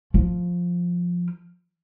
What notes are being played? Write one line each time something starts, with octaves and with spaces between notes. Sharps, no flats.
F3